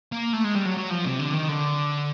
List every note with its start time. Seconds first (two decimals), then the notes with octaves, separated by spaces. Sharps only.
0.12 A#3
0.33 A3
0.44 G#3
0.55 G3
0.66 F#3
0.77 F#3
0.90 F3
1.05 C3
1.19 D3
1.34 D#3
1.49 D3